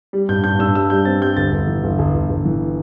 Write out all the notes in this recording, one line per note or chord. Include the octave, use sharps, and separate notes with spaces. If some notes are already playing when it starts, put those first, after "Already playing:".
G3
G2 G6
G2 G6
G2 E6
G3 E6
G3 G6
C4 A6
G3 G6
G1 A6
G1
E3
G1
G1
G1
G1
E3